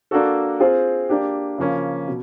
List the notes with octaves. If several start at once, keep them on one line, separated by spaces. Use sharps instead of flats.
A#3 D4 F#4 A4
C4 F4 G#4 C5
A#3 D4 G4
C#3 F3 A#3 C#4
B2